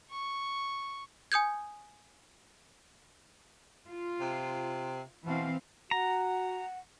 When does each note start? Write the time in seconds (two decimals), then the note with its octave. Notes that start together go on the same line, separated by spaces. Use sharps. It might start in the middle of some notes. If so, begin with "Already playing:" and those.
0.11 C#6
1.32 G#5 D#6 G6 G#6
3.87 F4
4.20 C3
5.26 B2 E3 C4 F5
5.91 F#4 F#5 A#5